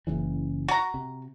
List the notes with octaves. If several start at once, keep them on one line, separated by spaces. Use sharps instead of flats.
F#1 C#3 E3
F#4 A#5
C3